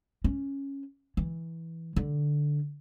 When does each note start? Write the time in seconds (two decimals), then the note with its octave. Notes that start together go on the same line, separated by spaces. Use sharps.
0.24 C#4
1.17 E3
1.96 D3